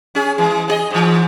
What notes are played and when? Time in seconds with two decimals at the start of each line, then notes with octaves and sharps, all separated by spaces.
0.15 C#4 G#4
0.38 E3 G#3
0.68 C#3 G#4 D#5
0.91 G#2 E3